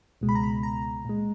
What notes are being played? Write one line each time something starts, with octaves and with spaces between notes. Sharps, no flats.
C#2 B2 G#3
B5
A#5
B5
A#5
A#2 G#3